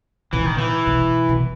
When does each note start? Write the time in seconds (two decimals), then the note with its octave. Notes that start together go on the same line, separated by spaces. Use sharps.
0.33 A#2 E3
0.46 D#3
0.58 E3
0.87 B2
1.29 B2